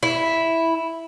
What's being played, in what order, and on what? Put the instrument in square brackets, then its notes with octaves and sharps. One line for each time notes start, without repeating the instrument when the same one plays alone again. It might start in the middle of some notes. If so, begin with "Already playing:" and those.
[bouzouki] E4